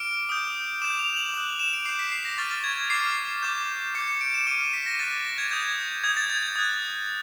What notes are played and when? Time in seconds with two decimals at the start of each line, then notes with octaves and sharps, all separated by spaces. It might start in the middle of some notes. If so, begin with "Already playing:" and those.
Already playing: D6 F6 D7
0.29 D#6 G6
0.82 D6 G6 E7
0.99 F7
1.16 F#7
1.34 D#6 F#6 F#7
1.59 E7
1.73 D7
1.85 D6 G6 C7
1.99 B6
2.12 C7
2.25 A#6
2.38 C#6 F6 A6
2.51 A6
2.64 G#6
2.90 D6 F6 C7
3.43 D6 G6
3.95 D6 G6 C#7
4.08 C#7
4.21 D7
4.34 E7
4.47 D6 F6 D#7
4.60 D#7
4.73 B6
4.86 A#6
4.99 D6 F#6 A6
5.25 A#6
5.38 G#6
5.51 D#6 G6 G#6
6.04 D#6 G6 G#6
6.17 A6
6.30 G#6
6.43 G#6
6.56 D#6 F#6